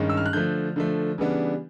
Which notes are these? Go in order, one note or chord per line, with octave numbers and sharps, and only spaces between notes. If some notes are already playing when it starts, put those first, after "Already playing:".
Already playing: G2 D#3 G#3 C#4
E6
F6
F#6
D3 F3 A3 G6
D3 F3 A3
C#3 E3 G3 B3 D4